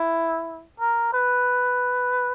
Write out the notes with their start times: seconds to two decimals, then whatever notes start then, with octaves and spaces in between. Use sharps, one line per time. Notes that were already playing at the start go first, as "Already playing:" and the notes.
Already playing: E4
0.79 A#4
1.13 B4